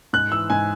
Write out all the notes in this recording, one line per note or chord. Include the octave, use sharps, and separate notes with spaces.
G#2 F#6
E3 E6
G#2 G#5